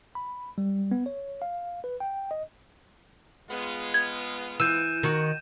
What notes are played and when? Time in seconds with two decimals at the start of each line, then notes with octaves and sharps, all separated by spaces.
0.15 B5
0.58 G3
0.91 B3
1.06 C#5
1.42 F5
1.84 B4
2.00 G5
2.31 D#5
3.51 G#3 B3 F4
3.94 G#6
4.60 E3 E6 G6 D#7 E7
5.03 D#3 F#4